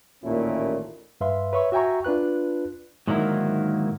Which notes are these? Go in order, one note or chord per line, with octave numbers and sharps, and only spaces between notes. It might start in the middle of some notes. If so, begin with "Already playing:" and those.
A1 D#2 A#2 A3 C#4 E4
G2 B4 E5 F5 C6
B4 C#5 E5 C#6
F#4 E5 G5 G#5 A#5 C#6
D4 F4 B4 F#6
G#2 D3 D#3 F#3 A#3 E4